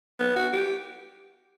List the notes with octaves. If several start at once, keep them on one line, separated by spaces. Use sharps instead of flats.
B3
F#4
G4